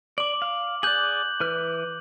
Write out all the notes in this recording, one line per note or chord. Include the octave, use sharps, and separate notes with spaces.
D5 D6 F#7
F5
G#4 D5 F#6 G6 F#7
E3 B4 F6